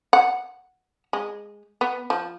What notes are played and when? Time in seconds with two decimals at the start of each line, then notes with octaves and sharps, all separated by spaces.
0.13 F#5
1.13 G#3
1.81 B3
2.10 F3